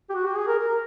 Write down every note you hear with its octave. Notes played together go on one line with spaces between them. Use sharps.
G4
F#4
G4
G#4
A#4
A#4